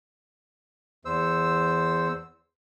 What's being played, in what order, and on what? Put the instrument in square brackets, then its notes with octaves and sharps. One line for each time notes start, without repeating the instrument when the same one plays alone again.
[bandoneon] E2 C5 E6